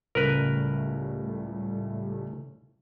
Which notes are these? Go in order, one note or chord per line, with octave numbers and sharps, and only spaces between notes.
C#2 A2 G3 A3 A#4 B4